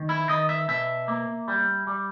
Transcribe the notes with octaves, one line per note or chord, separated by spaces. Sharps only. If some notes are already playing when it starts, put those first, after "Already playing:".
Already playing: D#3
E4
D#3 D#5
E5
B2 E5
A#3
G3
G3